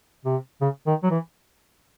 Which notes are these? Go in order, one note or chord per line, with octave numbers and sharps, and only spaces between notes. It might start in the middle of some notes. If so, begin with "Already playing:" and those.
C3
C#3
D#3
F#3
E3